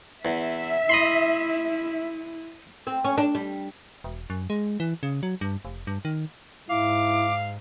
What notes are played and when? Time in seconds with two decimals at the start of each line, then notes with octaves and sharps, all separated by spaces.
0.25 E2 E5
0.89 E4 D#5 B5 C6
2.87 C4
3.04 C#4
3.18 D4
3.35 G3
4.04 E1
4.30 F#2
4.50 G#3
4.80 E3
5.03 C#3
5.23 F#3
5.41 G2
5.65 F1
5.87 G2
6.05 D#3
6.69 G#2 E4 F5 D6